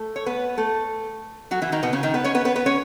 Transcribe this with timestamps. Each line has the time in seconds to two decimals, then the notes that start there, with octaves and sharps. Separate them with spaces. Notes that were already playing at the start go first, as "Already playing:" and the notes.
Already playing: A3 A4
0.16 C#5
0.26 B3 B4
0.57 A3 A4
1.51 F#3 F#4
1.62 E3 E4
1.72 D#3 D#4
1.83 B2 B3
1.93 C#3 C#4
2.03 D#3 D#4
2.14 B3 B4
2.24 C#4 C#5
2.35 B3 B4
2.45 B3 B4
2.56 B3 B4
2.66 C#4 C#5